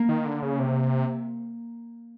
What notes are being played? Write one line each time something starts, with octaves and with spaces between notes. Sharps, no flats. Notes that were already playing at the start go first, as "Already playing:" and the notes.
Already playing: A#3
D#3
D3
C#3
C3